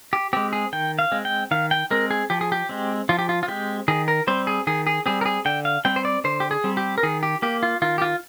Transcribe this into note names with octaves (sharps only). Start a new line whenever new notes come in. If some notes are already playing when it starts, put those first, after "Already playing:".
G4
G#3 C4 G4
G#4
D#3 G5
F5
G#3 C4
G5
D#3 F5
G5
G#3 C4 A#4
G#4
F3 G4
G#4
G4
G#3 C4
F3 F4
G4
F4
F4
G#3 C4 G4
D#3 G#4
A#4
G3 C4 C5
G#4
D#3 G#4
G#4
G3 C4 G#4
A#4
G#4
D3 G5
F5
G3 C4 G5
C5
D5
D3 C5
G4
G#4
G3 C4
G4
A#4
D#3 G#4
G4
A#3 G4
F4
D#3 F4
G4
F4